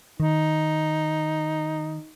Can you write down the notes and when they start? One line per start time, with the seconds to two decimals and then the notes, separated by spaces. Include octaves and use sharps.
0.20 D#3 D#4